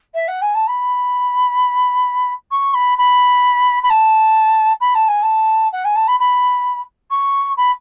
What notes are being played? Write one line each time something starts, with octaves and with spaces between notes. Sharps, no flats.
E5
F#5
G#5
A5
B5
C#6
B5
B5
B5
A5
B5
A5
G#5
A5
F#5
G#5
A5
B5
B5
C#6
B5